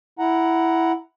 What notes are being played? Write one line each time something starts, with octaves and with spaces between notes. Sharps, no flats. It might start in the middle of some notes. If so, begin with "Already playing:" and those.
E4 F#5 A#5